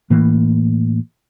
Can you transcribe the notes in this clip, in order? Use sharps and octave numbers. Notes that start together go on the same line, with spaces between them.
A2 E3 A#3